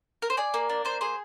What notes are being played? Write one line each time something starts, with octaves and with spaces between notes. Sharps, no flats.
A#4
C5
G#4 D5
A#3
D4
A#3 C5
G#4 C5